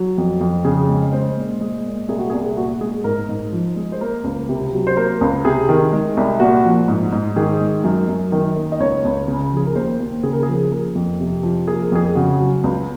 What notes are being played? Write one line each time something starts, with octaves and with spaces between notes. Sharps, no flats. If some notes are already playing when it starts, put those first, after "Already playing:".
Already playing: F#3
F2
F2
C#3 G#4
G#3
G#3 C5
A#2
G#3
A#2
C2 G#4
F#4
G#4
C2
A#2 F#4
G#3 G#4
G#2 A#4
G#2
F3
G#3
C5
A#3 A#4
C#2
C3
F#3
C5
A#3 A#4
C#2
C3 G#4
D#3
G#3
C2
A#2 F#4
F3
G#2
G#2
D#3 G#4
G#3
F#2
F#2
D#3
A#3
D#5
C#2 C#5
C#2
C#3
F3 G#4
A#4
D#2 C5
D#2
C#3 G#4
A#4
G#4
F3
G#4
A#3 A#4
F2
C3
F3
A#3 G#4
A#4
F2 G#4
C#3 F#4
F#3
C#2